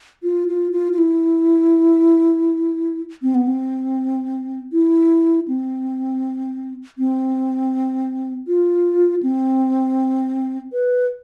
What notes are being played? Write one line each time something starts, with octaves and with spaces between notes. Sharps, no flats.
F4
F4
F4
F4
E4
C4
B3
C4
E4
C4
C4
F4
C4
B4